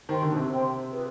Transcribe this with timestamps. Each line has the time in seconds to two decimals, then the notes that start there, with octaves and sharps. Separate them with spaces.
0.09 D#3 C5 G5 C6
0.22 D3
0.31 B2
0.36 C3
0.49 C5 G5 C6
0.91 F4 G#4 B4